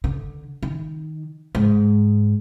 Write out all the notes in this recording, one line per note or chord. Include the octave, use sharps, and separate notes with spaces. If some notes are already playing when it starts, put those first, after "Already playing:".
D3
D#3
G#2